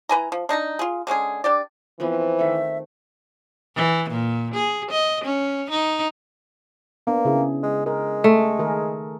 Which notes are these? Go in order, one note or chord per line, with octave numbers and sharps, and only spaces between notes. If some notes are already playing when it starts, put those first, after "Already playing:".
E3 B4 G#5 A#5
F3
D4 D#4 A5 A#5
F4 G#4
D3 G#3 C#4 G#4
D4 G4 D5
E3 F3 B3 C4
D#3 A3 E5
E3
A#2
G#4
D#5
C#4
D#4
A#3 B3 D4
C#3 E4 G#4
G#3
G#3 A#4
A3
D#3 G#4 A#4